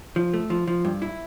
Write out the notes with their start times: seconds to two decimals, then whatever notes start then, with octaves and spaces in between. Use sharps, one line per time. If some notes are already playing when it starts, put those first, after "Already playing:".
0.16 F3
0.34 A3
0.50 F3
0.67 F3
0.85 G2
1.02 E4